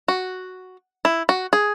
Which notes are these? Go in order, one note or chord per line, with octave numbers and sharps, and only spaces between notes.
F#4
E4
F#4
G#4